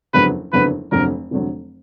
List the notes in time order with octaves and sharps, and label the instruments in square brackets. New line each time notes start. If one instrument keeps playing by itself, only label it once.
[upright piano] F#1 F2 D3 F#3 B3 [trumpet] B4
[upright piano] F#1 F2 D3 F#3 B3 [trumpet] B4
[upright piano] F1 F2 D3 F#3 [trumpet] A#4
[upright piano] F1 F2 D3 F#3